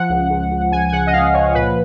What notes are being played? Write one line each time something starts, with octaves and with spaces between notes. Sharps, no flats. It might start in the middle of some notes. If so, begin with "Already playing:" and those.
Already playing: F3 F#5
C#2
C#2
C#2
C#2 G#5
G#5
C#3 F#5
D#5
C#2 F5
F3 C#5
A#2 B4